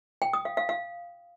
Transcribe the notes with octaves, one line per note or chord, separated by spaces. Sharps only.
G5
D#6
F5
F5
F5